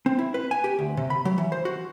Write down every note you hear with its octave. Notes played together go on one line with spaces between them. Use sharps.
C4
E4
B4
G#5
G4
D2
C3
B5
F#3
E3
C5
F#4